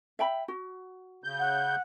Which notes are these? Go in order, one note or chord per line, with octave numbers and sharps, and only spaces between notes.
E5 G5 B5
F#4
C#3 G6
F#5